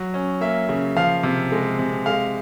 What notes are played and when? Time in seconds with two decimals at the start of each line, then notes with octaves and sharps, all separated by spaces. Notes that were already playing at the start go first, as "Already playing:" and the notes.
Already playing: F#3
0.14 C#4
0.41 A#3 E5
0.69 C#3
0.96 F3 F5
1.23 C3
1.52 G#3
1.79 C3
2.06 G#3 F5